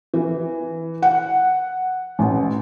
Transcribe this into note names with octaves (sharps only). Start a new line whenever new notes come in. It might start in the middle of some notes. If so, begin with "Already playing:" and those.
E3
F#5
A1